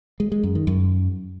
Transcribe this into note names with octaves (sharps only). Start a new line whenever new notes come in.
G#3
G#3
F#2
D#3
F#2